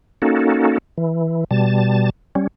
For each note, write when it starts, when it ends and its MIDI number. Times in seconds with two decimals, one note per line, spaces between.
0.22 0.78 58
0.22 0.78 61
0.22 0.78 63
0.22 0.78 66
0.22 0.78 69
0.98 1.44 52
1.51 2.10 47
1.51 2.10 55
1.51 2.10 81
2.35 2.47 55
2.35 2.47 61